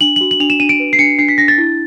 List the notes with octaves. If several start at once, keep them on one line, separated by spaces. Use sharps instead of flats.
D4 F#7
F#7
F#4
F#7
D4 F7
E7
D4 D#7
D7
B4
C7
D4 C#7
D4 C7
B6
D4 A#6
A6
E4